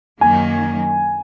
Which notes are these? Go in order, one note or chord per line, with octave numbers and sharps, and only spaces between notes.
F#2 D#3 F#3 A#3 G#5